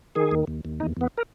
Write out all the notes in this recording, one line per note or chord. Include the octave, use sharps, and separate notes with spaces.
D#3 G#4
D#2
D#2
D#2
E2 D#4
E2 B3
A#4